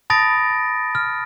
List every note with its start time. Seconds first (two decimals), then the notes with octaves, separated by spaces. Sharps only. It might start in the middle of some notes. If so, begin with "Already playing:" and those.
0.10 A5 B5 D#6 A6 A#6 D7
0.95 F6